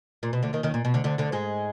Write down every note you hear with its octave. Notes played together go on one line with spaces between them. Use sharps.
A#2
B2
D2 D3
D#2 D#3
D#2 D#3
A#2
B2
D2 D3
D2 D3
D2 D3
G#2 G#3